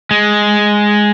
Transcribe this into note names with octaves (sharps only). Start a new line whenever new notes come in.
G#3